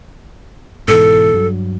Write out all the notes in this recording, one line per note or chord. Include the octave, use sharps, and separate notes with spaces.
G#2 B2 E3 A4
G2 F#3